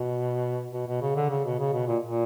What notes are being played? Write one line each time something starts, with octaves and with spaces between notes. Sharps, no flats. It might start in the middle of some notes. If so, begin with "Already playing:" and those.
Already playing: B2
B2
B2
C#3
D3
C#3
B2
C#3
B2
A#2
A#2